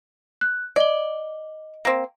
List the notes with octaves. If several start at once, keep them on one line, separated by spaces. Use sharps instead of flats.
F#6
D5 D#5 G7
A#3 C4